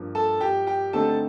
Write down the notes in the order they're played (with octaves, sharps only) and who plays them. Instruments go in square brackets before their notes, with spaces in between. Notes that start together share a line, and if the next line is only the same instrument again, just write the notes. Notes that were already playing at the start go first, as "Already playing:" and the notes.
Already playing: [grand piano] G2 F3 A#3
[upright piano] A4 A5
G4 G5
G4 G5
[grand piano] D3 A3 C4 D#4 [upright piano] A4 A5